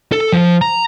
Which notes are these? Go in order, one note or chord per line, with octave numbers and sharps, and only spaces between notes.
A4
F3
A#5